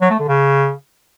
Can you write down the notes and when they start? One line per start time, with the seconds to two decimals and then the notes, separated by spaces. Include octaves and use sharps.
0.01 F#3
0.10 A3
0.19 D3
0.28 C#3